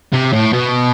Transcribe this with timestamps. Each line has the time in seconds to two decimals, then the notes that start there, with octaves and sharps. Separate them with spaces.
0.13 C3
0.33 A2
0.53 B2